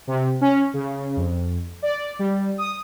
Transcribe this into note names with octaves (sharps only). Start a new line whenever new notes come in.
C3
C#4
C#3
F2
D5
G3
D#6